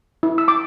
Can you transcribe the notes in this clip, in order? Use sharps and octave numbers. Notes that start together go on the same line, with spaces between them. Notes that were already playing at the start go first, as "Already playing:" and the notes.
E4
E6
D6